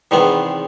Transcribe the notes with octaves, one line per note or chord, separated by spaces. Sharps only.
E2 C3 D#3 G#3 B3